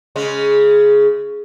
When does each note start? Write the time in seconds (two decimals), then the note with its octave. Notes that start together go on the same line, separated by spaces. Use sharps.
0.16 C#3 G#3